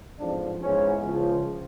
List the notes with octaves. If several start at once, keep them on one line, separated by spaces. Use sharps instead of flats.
A1 G#2 F3 C4 D4
G#2 E3 G#3 B3 C#4
C#2 C#3 F3